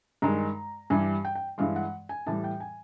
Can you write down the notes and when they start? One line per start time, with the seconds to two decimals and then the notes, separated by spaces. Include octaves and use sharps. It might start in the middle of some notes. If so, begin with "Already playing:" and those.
0.22 G2 D#3 G#3 A#5
0.90 G2 E3 G3 G#5
1.25 G5
1.35 G5
1.58 G2 E3 G#3 F5
1.76 F#5
2.09 G#5
2.26 A2 E3 G3 A5
2.44 G5
2.60 G#5